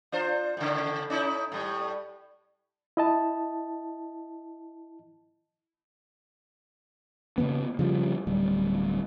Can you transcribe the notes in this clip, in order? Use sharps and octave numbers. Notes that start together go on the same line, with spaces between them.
D4 F4 C5
A2 C#3
C#4 D#4 E4
A2 G3
E4 D#5 A5
C#3 F#3 A#3 B3
C#3 F3 G3
D1 G3